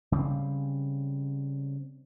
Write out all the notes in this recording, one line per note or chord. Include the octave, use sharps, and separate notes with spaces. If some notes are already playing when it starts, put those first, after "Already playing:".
C#3 G3 A#3 C4